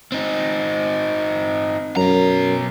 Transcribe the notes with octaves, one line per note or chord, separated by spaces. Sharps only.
C4 D#4
F#2 B2 A#5